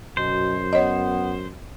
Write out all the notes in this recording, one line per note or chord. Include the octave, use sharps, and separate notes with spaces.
F#2 B2 C5
B3 C#5 D#5